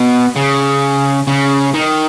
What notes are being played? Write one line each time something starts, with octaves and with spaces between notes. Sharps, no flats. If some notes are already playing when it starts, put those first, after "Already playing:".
Already playing: B2
C#3
C#3
D#3